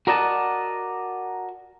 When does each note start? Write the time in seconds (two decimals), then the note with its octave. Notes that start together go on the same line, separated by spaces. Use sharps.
0.07 F#4 A#4 D5 D#5 F#5 A5